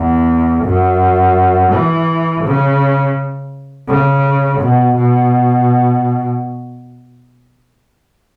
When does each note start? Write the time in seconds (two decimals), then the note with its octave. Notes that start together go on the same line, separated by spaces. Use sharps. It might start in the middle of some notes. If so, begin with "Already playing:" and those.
Already playing: E2
0.64 F#2
1.72 E3
2.44 C#3
3.88 C#3
4.60 B2
4.96 B2